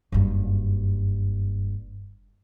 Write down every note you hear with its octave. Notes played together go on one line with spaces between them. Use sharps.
F#1 G2